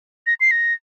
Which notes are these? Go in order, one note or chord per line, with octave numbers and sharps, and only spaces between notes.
A#6
C7
A#6